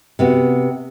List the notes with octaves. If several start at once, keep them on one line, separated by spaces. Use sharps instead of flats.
C3 B3 F#4